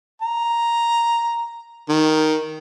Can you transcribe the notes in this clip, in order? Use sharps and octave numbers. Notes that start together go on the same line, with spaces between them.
A#5
D#3